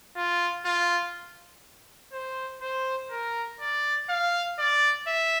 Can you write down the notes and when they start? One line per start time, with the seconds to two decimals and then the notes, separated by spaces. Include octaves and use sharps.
0.16 F4
0.65 F4
2.12 C5
2.62 C5
3.11 A#4
3.60 D5
4.09 F5
4.59 D5
5.07 E5